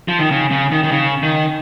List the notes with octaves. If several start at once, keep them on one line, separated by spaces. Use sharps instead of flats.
F3
D#3
C#3
C#3
D#3
D#3
C#3
D#3